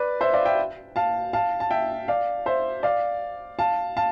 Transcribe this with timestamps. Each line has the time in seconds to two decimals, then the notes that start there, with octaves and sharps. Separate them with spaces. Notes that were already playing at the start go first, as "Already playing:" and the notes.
Already playing: B4 D5
0.21 C5 E5
0.33 D5 F5
0.45 E5 G5
0.96 F5 A5
1.33 F5 A5
1.60 A5
1.71 E5 G5
2.08 D5 F5
2.46 C5 E5
2.83 D5 F5
3.59 F5 A5
3.97 F5 A5